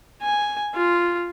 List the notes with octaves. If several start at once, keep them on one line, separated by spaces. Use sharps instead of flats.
G#5
F4